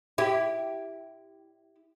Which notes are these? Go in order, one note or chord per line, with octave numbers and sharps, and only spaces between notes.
E4 G4